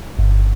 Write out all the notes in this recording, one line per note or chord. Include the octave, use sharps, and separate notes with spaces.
G1